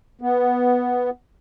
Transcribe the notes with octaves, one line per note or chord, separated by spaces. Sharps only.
B3